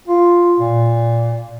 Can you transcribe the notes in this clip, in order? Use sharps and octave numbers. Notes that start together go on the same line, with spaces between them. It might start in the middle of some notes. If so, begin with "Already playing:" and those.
F4
A#2